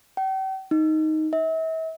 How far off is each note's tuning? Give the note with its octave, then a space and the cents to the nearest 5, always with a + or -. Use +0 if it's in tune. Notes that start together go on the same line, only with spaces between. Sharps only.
G5 -40
D#4 +5
E5 -40